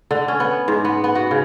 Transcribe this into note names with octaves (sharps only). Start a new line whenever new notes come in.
D3
C#4
B3
G#2
B3
B3
F#4
C#3